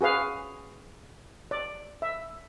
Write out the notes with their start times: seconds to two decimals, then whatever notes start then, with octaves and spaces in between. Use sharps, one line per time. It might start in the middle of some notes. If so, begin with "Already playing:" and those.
0.01 F#4 G#4 B4 F5
1.51 D5
2.02 E5